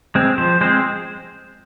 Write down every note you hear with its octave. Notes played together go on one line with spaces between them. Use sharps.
G#3 C4
F3 C5
G#3 C4 C5